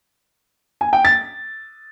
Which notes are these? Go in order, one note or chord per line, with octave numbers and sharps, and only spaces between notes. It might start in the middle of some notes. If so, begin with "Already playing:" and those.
G#5
G5
A6